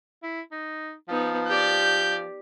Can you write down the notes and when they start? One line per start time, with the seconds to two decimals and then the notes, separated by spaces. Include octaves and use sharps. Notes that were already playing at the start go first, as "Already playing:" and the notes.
0.23 E4
0.52 D#4
1.09 F3 B3 D#4
1.48 G4 D5 G6